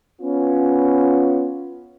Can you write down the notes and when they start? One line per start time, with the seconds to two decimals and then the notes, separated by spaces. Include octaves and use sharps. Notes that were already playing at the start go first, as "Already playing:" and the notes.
0.21 B3 C#4 F4